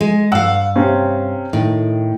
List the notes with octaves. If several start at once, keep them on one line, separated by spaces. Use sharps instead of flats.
G#3
G2 F5 F#5 E6
C3 C4 C#4
A2 D#3